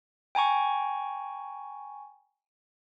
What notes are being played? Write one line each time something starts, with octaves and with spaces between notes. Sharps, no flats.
G5 G#5 A#5 C#6